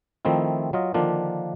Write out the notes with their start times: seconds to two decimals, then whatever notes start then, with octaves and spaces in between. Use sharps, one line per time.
0.25 D#3 F3 A3 C4 D#4 E4
0.73 F#3 F4 D#5
0.94 D3 D#3 F3 A#3 D4 F4